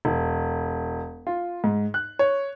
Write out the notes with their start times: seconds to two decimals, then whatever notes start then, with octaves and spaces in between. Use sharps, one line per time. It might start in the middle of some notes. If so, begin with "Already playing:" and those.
0.05 E1
1.27 F4
1.64 G#2
1.94 F#6
2.19 C#5